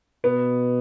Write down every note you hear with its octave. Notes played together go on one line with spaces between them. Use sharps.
B2 B3